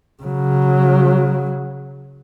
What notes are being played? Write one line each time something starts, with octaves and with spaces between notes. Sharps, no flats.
C#3 F#3